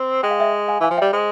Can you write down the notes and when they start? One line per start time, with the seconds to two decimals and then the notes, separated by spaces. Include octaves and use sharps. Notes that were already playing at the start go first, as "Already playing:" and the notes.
Already playing: C4
0.23 G#3 G5
0.31 F5
0.39 E5 G5
0.68 F5 G#5
0.80 E3 F5 G#5
0.90 F3
0.97 E5 G5
1.01 G3
1.13 G#3 C5